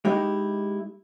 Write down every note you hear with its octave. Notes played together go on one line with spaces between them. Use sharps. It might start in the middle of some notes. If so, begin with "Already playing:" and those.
G#3 D#4 E4 G4